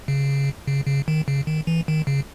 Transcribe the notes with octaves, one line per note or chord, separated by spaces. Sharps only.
C#3
C#3
C#3
D#3
C#3
D#3
E3
D#3
C#3